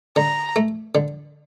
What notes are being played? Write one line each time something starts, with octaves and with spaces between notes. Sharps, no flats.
D3 A#5
A3
D3